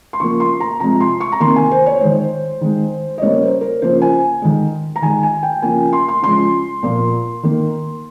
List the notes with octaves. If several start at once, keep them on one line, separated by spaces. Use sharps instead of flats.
C6
C#3 F3 A#3 C#6
C6
A#5
C3 F3 G#3 A#5
C6
C#6
A#5
C3 D#3 A#3 C6
G#5
C5
C#5
D#3 G#3 C5
D#3 G#3
D#5
C#3 G3 A#3 C#5
C5
A#4
C#3 F3 A#3 C5
G#5
D#3 G#3
A#5
D#3 G#3 G#5
G#5
G5
C#3 F3 A#3 G#5
C6
C6
C#3 F3 G#3 C6
A#2 F3 A#3
D#3 A#3